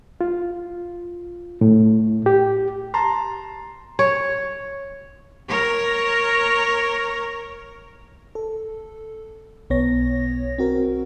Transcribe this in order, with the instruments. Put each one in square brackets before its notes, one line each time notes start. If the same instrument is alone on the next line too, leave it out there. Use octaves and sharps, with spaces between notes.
[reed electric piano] F4
A2
G4
[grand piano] A5 A#5 C6
[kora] C#5
[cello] A#4 C#5
[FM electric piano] A4
B1 B3 C#5 A#6
C4 F#4 A#4